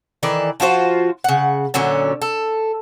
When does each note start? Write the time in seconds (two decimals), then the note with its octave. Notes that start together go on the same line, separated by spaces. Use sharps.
0.23 D#3 E3 A4 D5
0.60 F3 F4 F#4 C5
1.24 C#3 F#5
1.74 A#2 D3 F#3 C#4
2.22 A4